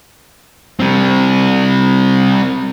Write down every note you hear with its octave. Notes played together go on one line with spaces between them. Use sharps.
G3 C4